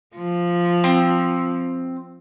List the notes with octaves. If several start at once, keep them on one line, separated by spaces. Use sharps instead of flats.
F3
C4